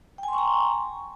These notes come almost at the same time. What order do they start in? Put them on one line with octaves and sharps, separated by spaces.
G5 G#5 C6 C#6 A#5